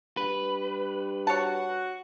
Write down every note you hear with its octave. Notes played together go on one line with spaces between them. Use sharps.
G2 B4
F#4 C#5 F#5 A5